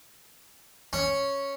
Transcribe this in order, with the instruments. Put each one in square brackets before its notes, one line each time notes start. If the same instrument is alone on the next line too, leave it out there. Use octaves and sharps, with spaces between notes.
[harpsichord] C#4